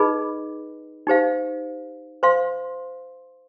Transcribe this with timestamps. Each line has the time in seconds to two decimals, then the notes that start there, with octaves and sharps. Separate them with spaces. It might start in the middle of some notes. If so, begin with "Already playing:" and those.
Already playing: D#4 G#4 B4 D#5 B5
1.07 D#4 G4 C5 F5
2.23 C5 F5 C6